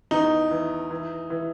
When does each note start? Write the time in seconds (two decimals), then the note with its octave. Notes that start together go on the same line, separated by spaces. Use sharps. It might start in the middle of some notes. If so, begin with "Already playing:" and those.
0.11 E2 D#4
0.51 E3
0.91 E3
1.30 E3